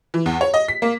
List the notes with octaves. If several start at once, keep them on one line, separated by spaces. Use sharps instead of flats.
E3
E2
C#5
D#5
B6
A#3